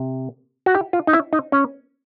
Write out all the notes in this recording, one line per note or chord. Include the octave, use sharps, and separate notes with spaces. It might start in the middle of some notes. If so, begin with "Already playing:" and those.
Already playing: C3
F#4
G4
F4
D#4
E4
D#4
C#4